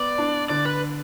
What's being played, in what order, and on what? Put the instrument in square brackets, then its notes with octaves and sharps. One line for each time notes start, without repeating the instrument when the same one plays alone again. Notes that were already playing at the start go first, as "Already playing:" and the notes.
Already playing: [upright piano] B3 [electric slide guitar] D5
[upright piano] D4
[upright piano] D3 [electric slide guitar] D5
[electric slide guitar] B4